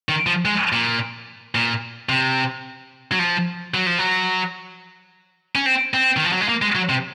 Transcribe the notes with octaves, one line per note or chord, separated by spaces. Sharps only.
D#3
F3
G#3
A#2
A#2
C3
F#3
F3
F#3
F3
F#3
C#4
C4
C4
D#3
F3
F#3
G#3
A#3
G#3
F#3
C3